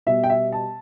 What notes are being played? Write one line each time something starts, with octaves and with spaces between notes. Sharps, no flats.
B2 G3 E5
G5
E5
A5